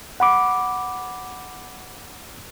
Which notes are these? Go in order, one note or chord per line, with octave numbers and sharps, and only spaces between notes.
F#5 B5 D6